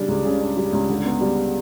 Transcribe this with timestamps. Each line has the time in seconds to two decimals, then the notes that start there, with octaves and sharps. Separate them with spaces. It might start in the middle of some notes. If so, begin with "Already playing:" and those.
Already playing: C#3 G3 D4
0.08 C#2
0.25 C#3
0.41 D4
0.57 G3
0.73 C#2
0.89 D3
1.05 B3
1.21 G3